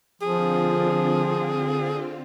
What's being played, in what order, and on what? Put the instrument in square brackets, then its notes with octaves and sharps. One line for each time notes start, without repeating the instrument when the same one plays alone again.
[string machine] D3 C4 F4 [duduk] F3 [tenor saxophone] G#4